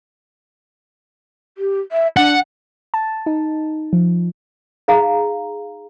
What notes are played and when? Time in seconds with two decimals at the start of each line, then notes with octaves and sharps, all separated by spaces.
1.58 G4
1.92 E5
2.17 D4 F#5
2.94 A5
3.26 D#4
3.93 F3
4.88 D#4 G#4 F5 A#5